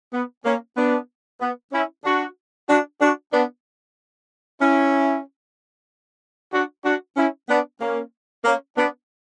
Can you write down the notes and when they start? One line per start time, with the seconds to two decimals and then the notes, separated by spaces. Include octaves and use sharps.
0.13 B3
0.45 A#3 C#4
0.77 B3 D4
1.41 B3
1.73 C#4 E4
2.05 D4 F#4
2.69 D4 F#4
3.01 D4 F#4
3.33 B3 D4
4.61 C#4 E4
6.53 D4 F#4
6.85 D4 F#4
7.17 C#4 E4
7.49 B3 D4
7.81 A#3 C#4
8.45 A#3 C#4
8.77 B3 D4